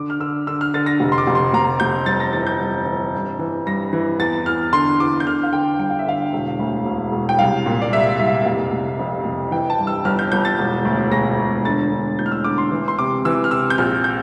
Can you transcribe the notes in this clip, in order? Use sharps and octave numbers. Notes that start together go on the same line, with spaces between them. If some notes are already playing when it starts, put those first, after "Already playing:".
Already playing: D3 D6
F6
D3 E6
D3 E6
F6
D3 A6
A#6
F1
C6
D6
F1
C6
F1 A#5
F1 G6
G1 A6
A#6
E3 A6
G6
G1
E3
G2
E3
G2 A#6
E3
E2 A6
E2 F6
D3 C6
E2 D6
G6
D3 F6
F5
D3 G5
G1 G5
F5
E5
D3 F5
E1
D2
E1
E1
G5
C2 F5
A#2
D5
C2 E5
C2 E5
F5
E5
F1 F5
F1
F2
F1
E3 G5
A5
G2
E6
G1 F6
G6
G1 G6
A6
E1
D2
E1 A#6
E1
D3 A6
D3
A1 G6
F6
E6
D3 D6
C6
E3
C6
C3 D6
E3 E6
F6
C3 E6
G6
A#1 F6
G6